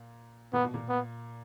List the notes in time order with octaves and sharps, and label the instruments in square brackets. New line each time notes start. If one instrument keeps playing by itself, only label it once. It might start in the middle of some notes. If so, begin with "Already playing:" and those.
Already playing: [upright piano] A#2
[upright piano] A#2 [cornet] B3
[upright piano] B2
A#2
[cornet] B3